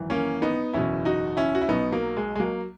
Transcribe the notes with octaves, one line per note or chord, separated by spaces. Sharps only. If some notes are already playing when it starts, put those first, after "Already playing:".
Already playing: G#1 F#2 E3
A#3 C#4
B3 D#4
F#1 E2 B2 C#4 E4
D#4 F#4
C#4 E4
F#4
E4
B1 B2 B3 D#4
F#3 A#3
G#3
G#3
F#3 A#3